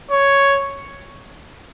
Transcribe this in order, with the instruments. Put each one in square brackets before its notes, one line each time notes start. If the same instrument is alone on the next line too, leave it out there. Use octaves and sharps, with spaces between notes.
[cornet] C#5